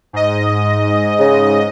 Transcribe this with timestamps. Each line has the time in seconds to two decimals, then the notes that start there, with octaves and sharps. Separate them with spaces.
0.13 G#2 D#5
1.19 C#3